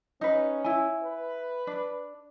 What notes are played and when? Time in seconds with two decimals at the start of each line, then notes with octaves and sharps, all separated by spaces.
0.21 C#4 D#4 B4
0.64 E4 G#5
1.04 B4
1.67 D4